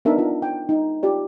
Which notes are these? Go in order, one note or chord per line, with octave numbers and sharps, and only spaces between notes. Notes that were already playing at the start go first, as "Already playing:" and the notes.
B3 D4 D#4 A#4 E5 A5
D4 F4
G5
D#4
F4 G4 D5